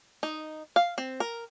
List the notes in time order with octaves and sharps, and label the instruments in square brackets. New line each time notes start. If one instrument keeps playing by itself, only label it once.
[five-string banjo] D#4
F5
C4
A#4